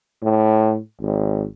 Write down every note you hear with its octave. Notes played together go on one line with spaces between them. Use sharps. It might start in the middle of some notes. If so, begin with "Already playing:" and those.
A2
G#1